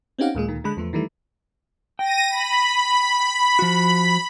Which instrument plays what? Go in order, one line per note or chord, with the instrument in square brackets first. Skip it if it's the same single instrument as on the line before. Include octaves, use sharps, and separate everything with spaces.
[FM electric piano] C4 C#4 D#4 G4 F5 F#5
D#2 A#2 G#3 G#4
D2 A#2 D#3
D3 G#3 B5 F#6
E2 F3 A3
D#3 E3 G3 A3
[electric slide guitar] G5 [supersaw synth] A#6 D#7
[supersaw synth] B5
[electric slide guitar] F3 F#4